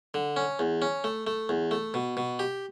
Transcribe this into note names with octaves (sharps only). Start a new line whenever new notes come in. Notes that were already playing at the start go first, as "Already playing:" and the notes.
D3
C#4
E2
C#4
A3
A3
E2
A3
B2
B2
G4